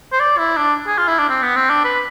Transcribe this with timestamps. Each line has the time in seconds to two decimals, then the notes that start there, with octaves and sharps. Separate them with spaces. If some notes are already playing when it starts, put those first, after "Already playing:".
0.13 C5
0.20 D5
0.38 E4
0.57 D4
0.87 G#4
0.98 F4
1.08 E4
1.19 D4
1.29 C4
1.42 B3
1.56 C4
1.70 D4
1.84 B4